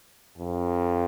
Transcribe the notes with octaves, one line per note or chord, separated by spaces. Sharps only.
F2